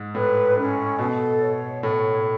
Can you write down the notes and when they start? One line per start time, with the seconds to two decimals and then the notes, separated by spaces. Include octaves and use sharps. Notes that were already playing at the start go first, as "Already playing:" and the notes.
Already playing: G#2
0.14 A2 B4
0.57 C#4
0.98 B2 A4
1.40 C#5
1.83 A2 C#5